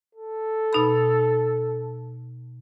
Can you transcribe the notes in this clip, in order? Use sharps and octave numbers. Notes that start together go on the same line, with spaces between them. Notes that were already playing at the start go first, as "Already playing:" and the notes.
A4
B2 D#4 B5